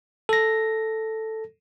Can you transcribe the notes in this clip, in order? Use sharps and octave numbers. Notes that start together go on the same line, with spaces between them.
A4 A#6